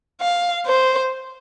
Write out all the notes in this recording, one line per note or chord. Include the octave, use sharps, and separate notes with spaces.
F5
C5